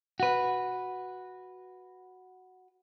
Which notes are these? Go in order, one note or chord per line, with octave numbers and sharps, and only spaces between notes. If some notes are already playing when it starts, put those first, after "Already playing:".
F#4 B4